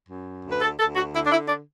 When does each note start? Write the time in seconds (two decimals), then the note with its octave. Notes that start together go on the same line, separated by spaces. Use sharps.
0.09 F#2
0.44 D2
0.49 B4
0.62 A4
0.78 D2 A4
0.96 F#4
1.14 D3 E4
1.26 D4
1.32 E4
1.49 D4